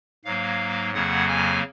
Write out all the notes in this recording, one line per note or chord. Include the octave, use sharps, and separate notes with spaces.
G#2 F#3 A#3 F5
F2 C#3 F#3 A#3 F#5
G#5